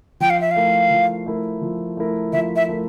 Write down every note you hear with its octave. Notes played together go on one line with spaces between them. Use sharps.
F3 G5
F5
E5
F5
A3 E4 A#4
F3
A3 E4 A#4
F3
A3 E4 A#4
F3 E5
E5
A3 E4 A#4